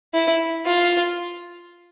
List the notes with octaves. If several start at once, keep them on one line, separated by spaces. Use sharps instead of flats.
E4
F4